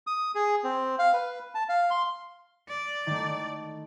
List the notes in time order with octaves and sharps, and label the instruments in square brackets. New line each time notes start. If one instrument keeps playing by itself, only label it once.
[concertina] D#6
G#4
C4
F5
B4
A5
F5
C6
[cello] D5
[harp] D#3 A3